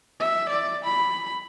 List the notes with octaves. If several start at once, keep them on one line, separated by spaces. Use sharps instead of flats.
E5
D5
B5